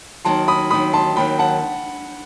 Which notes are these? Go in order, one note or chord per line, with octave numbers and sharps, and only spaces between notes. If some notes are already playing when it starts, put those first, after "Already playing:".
D#2 D#3 F#3 A5 C6
B5 D#6
D#2 D#3 F#3 B5 D#6
A5 C6
D#2 D#3 F#3 G5 B5
F#5 A5